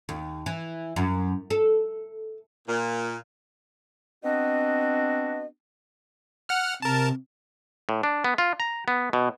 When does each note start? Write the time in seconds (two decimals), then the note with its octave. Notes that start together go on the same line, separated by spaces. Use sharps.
0.09 D#2
0.46 E3
0.96 F#2
1.50 A4
2.67 A#2
4.24 B3 C4 D4 F#4 D#5
6.49 F#5 F6
6.82 C3 A#4 A5
7.89 A2
8.03 D4
8.24 B3
8.38 F4
8.60 A#5
8.88 B3
9.13 B2